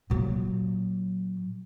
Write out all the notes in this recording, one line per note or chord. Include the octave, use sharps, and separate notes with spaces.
A#2 F#3